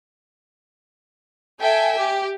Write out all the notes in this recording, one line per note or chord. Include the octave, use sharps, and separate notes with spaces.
A4 E5 G5 G#5
G4